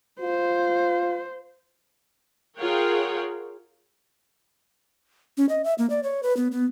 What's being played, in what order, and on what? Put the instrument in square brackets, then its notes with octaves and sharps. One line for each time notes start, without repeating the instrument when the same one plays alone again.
[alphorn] F4 [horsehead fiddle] C5
[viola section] F4 G#4 A#4 C#5 F#5 G5
[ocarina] C#4
D#5
E5
A#3
D5
C#5
B4
B3
B3